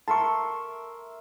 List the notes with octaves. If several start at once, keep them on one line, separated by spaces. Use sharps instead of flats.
A#4 E5 A5 C6 C#6